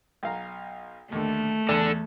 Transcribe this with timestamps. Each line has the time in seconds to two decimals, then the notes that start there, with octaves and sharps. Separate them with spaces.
0.23 B1 F5 A#5
1.12 D#2 D3 A3
1.69 E2 A4 D5